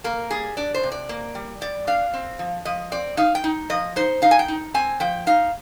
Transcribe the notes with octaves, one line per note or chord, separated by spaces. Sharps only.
A#3 A#4
G3 G#4
D4 D5
C5
C3
D5
A#3
G3
G3 D5
D4 F5
C4
F3
F3 D#5
C4 D5
D#4 F5
G5
D#4
F3 D#5
D#4 C5
D#4 F5
G#5
G5
D#4
C4 G#5
F3 G5
D#4 F5